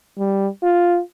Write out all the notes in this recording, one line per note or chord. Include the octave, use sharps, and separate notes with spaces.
G3
F4